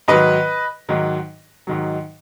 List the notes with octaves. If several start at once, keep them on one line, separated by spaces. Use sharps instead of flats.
G#2 D#3 F#3 B4 D#5
G#2 D#3 F#3
G#2 D#3 F#3